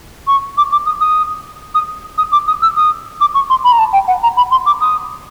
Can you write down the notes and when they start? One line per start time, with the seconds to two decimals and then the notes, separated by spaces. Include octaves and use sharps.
0.27 C#6
0.57 D6
0.71 D6
0.85 D#6
1.00 D#6
1.74 D#6
2.17 D#6
2.31 D6
2.47 D#6
2.61 E6
2.76 D#6
3.20 D6
3.34 C#6
3.49 C6
3.63 B5
3.72 A#5
3.78 A5
3.92 G5
4.07 F#5
4.22 A#5
4.36 B5
4.51 C6
4.65 D6
4.81 D#6